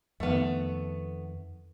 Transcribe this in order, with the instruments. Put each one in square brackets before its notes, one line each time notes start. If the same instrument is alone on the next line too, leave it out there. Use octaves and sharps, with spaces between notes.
[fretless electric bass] F2 D#3 [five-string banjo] A3 B3